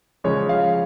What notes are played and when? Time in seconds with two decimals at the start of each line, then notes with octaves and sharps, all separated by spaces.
0.24 C#3 F3 G#3 C#5
0.49 F5